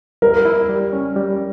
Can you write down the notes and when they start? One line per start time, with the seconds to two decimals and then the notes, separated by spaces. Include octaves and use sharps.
0.22 G3 A#4
0.45 E4
0.69 G3
0.92 C#4
1.16 G3